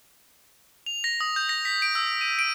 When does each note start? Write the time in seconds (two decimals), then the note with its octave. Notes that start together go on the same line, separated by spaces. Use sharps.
0.86 F7
1.04 A#6
1.21 D#6
1.36 G6
1.49 A#6
1.65 B6
1.82 D7
1.95 E6
2.21 D#7
2.39 D7